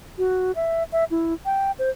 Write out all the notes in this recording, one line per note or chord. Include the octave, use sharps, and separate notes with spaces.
F#4
E5
E5
E4
G5
C5